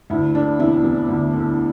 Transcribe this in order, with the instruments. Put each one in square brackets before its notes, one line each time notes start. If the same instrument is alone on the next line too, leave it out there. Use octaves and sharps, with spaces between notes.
[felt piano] D2 E4
D3 D4
E1 E4
E1
D2
D3